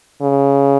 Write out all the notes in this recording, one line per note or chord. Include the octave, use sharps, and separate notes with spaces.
C#3